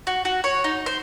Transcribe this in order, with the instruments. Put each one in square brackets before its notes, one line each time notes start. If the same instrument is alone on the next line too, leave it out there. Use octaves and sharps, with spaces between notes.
[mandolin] F#4
F#4
C#5
D#4
C5